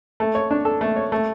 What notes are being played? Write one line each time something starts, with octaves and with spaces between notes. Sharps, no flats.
A3
C#5
D4
A4
A3
C#5
A3